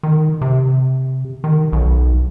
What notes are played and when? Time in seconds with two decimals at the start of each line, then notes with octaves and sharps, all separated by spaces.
0.03 D#3
0.42 C3
1.44 D#3
1.73 B1